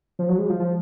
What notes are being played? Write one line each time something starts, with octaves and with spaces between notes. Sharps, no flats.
F3
F#3
G#3
F3
F3